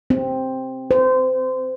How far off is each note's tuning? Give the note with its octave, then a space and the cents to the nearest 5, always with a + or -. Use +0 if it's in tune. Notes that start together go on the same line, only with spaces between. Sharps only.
C4 +5
C5 -25